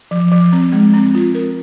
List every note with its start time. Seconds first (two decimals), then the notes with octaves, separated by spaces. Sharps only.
0.11 F3
0.32 F3
0.53 C4
0.72 G#3
0.94 C4
1.15 F4
1.35 A#4